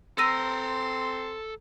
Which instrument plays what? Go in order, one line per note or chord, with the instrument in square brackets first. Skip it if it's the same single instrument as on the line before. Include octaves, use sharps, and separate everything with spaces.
[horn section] C4 C6 [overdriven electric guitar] A4 A#5 [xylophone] E6 A#6 D#7